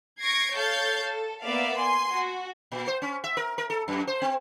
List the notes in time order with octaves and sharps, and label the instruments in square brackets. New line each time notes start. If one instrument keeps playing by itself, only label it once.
[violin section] C#6 G#6 A#6 C7 D7
A4 C#5 F5 G6 A6
A4
A#3 B3 D5 E5 F5
G#5 C6
F#4
[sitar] A#2
C5
C#4
E5
A#4
A#4
A4
F#2
C5
C4